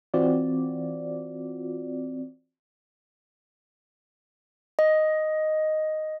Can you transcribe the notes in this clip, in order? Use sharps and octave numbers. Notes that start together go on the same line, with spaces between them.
E3 C4 F4 F#4 D5
D#5